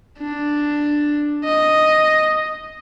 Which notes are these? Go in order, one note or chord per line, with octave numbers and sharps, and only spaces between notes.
D4
D#5